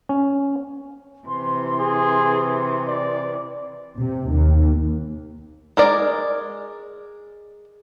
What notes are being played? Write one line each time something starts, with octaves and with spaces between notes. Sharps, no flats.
C#4
C3 E3 C6
G#4
D5
C3
D#2
G#3 A#4 D5